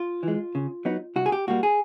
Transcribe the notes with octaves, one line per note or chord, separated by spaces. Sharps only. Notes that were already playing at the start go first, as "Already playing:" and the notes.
Already playing: F4
E3 G#3
C#3
F#3 B3 D#4
C2 F#4
G#4
G4
A#2 G3 A#3 F#4
G#4